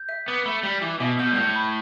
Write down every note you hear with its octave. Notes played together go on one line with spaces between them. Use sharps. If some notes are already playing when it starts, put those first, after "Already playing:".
Already playing: G6
E5
B3 D6
A3 B5
G3 B5
E3 D6
B2 E5
B2 G6
G2
A2 G6
B5